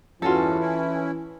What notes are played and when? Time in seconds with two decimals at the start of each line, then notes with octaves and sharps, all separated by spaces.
0.22 E2 G2 E3 C#4 F4 F#4 A4
0.59 C#4 E4